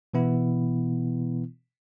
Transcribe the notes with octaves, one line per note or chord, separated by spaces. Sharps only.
B2 E3 B3 E4